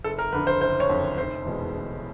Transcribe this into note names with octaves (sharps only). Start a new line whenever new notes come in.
F#1 A4
A#4
F2 D3 B4
C5
F#1 C5
C#5
F2 D3
F1 C5
E2 B2 G#3
F1